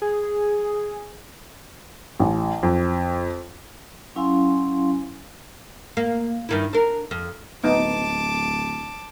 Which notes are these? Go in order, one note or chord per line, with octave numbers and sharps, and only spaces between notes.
G#4
A1
F2
F#3 C#4 E4 F5 G#5 C6
A#3
G2 D#3 E4
D4 A#4
F2
D1 B3 D#4 A5 D6